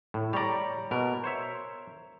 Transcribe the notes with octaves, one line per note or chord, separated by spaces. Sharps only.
A2
G3 C#5 D5 A#5
B2 A#4
C5 C#5 E5